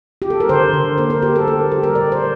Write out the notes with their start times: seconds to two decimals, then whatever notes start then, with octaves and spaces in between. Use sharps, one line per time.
0.22 G4
0.30 A4
0.40 A#4
0.49 D3 C5
0.74 D3
0.98 A#3 C5
1.10 A#4
1.22 A#3 G4
1.36 A4
1.47 A#3 A#4
1.71 G3 G4
1.83 A#4
1.95 A#2 D5
2.12 C5